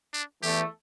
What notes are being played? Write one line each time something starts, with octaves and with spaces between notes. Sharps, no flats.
D4
E2 E3 A3 G4